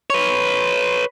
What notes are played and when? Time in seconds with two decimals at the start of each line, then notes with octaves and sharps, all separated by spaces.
0.10 B4 C#5